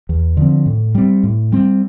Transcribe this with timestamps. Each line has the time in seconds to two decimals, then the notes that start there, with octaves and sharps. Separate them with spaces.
0.09 E2
0.37 D3 F3 C4
0.66 A2
0.95 G3 C4
1.23 A2
1.52 G3 C4